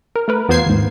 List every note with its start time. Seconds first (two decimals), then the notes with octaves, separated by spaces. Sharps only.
0.16 A#4
0.28 A3 A#4 B4
0.49 E2 B3 F4 C5 G#6 C7
0.66 D#2 G#2